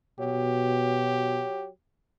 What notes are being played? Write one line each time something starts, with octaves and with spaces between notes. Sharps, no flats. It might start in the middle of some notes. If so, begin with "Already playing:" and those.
B2 F#3 G4